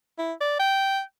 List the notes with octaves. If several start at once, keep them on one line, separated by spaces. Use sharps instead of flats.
E4
D5
G5